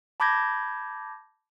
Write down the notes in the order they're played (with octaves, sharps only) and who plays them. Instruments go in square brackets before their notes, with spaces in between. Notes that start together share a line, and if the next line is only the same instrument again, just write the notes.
[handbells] A5 B5 D6 G6 G#6 A#6